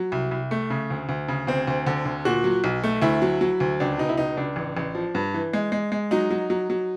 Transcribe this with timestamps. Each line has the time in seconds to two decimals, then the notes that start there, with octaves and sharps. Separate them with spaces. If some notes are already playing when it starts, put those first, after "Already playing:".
Already playing: F#3
0.12 C2
0.31 C2
0.51 A3
0.70 C#3
0.90 D2
1.09 D2
1.28 C#3
1.47 D2 C4
1.68 D2
1.86 D3
2.05 D2
2.25 A#2 F#4
2.44 F#3
2.64 B1
2.84 A3
3.02 D2 E4
3.22 F#3
3.41 F#3
3.60 D2
3.80 C#2 D4
3.98 B2 D#4
4.09 E4
4.17 C#2 D#4
4.37 C#2 D4
4.56 A1
4.77 A1
4.95 F3
5.15 G2
5.34 E3
5.53 G#3
5.72 G#3
5.92 G#3
6.11 F#3 D#4
6.31 F#3
6.50 F#3
6.70 F#3